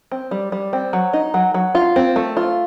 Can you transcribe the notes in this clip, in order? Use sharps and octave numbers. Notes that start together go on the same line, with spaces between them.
C4
G3
G3
C4
F#3
D#4
F#3
F#3
F4
C4
A3
F4